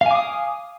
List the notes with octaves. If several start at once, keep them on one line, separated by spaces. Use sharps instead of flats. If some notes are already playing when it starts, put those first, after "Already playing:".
F5 G#5 D6 D#6